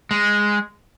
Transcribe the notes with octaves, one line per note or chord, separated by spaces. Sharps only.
G#3